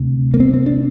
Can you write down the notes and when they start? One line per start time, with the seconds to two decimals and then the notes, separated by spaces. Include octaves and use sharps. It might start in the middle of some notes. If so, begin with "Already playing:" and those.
Already playing: D2 C3
0.34 A#3
0.40 C4
0.54 C4
0.66 D4